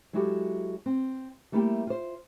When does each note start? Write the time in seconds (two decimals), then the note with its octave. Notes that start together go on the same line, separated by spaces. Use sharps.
0.13 F#3 G#3 E4 F#4 G4 A4
0.86 C4
1.52 G3 A3 A#3 E4 F#4 G4
1.87 F4 C5